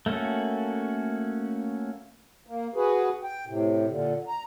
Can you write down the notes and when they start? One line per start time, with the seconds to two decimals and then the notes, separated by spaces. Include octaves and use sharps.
0.06 A3 A#3 C#4 F#4 A4
2.47 A#3
2.75 F#4 G#4 B4
3.23 G5
3.47 A2 C3
3.88 A#2 D3
4.28 A#5